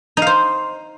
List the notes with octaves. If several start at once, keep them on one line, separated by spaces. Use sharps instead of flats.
D#4 C5 F5